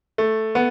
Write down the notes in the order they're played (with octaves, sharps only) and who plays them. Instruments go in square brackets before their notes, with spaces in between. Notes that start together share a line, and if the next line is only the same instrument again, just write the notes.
[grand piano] A3
B3